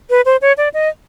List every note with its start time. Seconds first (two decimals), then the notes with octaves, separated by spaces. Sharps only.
0.10 B4
0.25 C5
0.42 C#5
0.58 D5
0.74 D#5